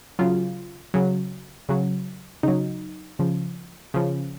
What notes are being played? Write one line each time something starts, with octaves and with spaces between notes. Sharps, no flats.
C#3 F#3 F4
C#3 F#3
C#3 F#3
C#3 F#3 D#4
C#3 F3
C#3 F3